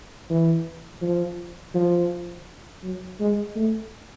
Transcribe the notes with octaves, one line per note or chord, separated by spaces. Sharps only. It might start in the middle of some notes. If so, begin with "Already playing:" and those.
E3
F3
F3
F#3
G#3
A3